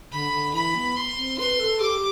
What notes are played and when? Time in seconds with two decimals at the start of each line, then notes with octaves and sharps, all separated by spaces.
0.11 D3 B5
0.32 D3
0.54 E3 B5
0.75 B3
0.96 C6
1.17 C4
1.38 B4 C6
1.60 A4
1.81 G4 D6